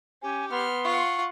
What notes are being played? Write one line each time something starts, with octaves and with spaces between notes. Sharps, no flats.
C#4 G4 G#5
B3 C6 F6
F4 F#5 C#6